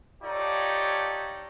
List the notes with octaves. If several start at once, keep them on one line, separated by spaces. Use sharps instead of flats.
D#4 F4 G4 A4 C#5 D5